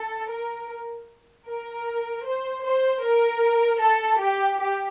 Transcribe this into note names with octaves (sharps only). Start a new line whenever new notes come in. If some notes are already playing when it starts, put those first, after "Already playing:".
Already playing: A4
A#4
A#4
C5
C5
A#4
A4
G4
G4